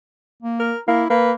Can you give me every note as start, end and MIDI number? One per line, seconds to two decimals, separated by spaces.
0.43 0.72 58
0.60 0.80 70
0.88 1.05 58
0.88 1.08 64
1.10 1.33 58
1.10 1.32 71